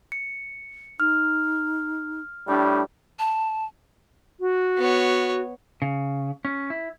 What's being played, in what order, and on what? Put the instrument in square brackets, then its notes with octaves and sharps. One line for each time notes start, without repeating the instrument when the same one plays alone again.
[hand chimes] C#7
[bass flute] D#4 [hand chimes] F6
[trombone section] A2 G3 [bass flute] D4
[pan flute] A5
[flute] F#4
[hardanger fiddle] B3 C#5
[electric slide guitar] C#3
C#4
E4